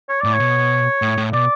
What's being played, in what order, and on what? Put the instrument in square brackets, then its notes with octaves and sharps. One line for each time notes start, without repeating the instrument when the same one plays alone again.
[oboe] C#5
[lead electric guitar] A2 [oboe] D5
[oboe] C#5
[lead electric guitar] B2
A2
A2
[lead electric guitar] B2 [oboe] D5